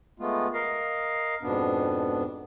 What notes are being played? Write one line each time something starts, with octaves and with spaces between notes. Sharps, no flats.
G#3 A3 B3 F4
A#4 D#5 F5
F2 G#2 B2 B3 D4